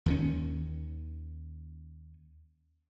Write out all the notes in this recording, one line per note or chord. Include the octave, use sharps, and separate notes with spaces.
D#2 D#3 C#4